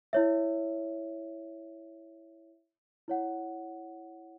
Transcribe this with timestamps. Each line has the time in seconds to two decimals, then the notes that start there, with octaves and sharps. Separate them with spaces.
0.13 E4 C#5 E5
3.08 E4 C#5 F#5